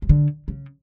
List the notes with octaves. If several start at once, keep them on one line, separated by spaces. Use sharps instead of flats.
F3
D3
C#3